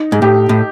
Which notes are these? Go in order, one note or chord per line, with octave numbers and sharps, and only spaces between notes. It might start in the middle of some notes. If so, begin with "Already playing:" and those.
Already playing: D#4
G#2
A2 G4
A2